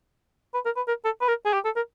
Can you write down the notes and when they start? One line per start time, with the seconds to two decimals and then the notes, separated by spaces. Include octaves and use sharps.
0.54 B4
0.65 A#4
0.76 B4
0.88 A#4
1.05 A4
1.21 B4
1.29 A#4
1.45 G#4
1.54 G4
1.65 A4
1.76 A#4